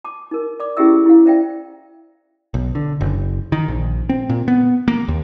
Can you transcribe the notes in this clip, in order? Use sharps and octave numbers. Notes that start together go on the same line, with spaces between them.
A5 D6
D#4 A#4
D5 D6
C#4 E4 G4 G#4 E5 E6
E4 F5
C5 D5 E5 F5 G5
B1
D3
F#1
D#3
A#1
C4
A#2
B3
A#3
D#2